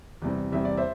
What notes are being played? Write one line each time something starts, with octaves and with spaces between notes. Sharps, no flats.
E2 C3 G3 C4
E2 C3 G3 C4 E5
D5
C5 E5